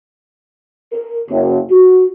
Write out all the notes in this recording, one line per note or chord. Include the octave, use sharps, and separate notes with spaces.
A#4
F#1
F#4